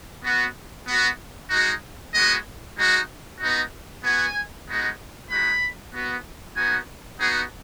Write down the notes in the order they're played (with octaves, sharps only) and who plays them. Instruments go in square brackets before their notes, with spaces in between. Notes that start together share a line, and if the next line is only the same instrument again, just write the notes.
[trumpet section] B3 F#4
B3 F#4
G#3 D#4 F#4
G#3 B3 F#4 D#5
G#3 D#4 F#4
B3 D#4 F#4
B3 F#4 G#5
G#3 B3 D#4 F#4
G#3 D#4 F#4 B5
B3 F#4
B3 D#4 F#4 G#5
B3 D#4 F#4 G#4